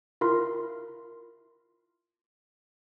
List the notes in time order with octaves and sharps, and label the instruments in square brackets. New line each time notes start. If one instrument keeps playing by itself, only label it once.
[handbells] E4 F4 A#4 C6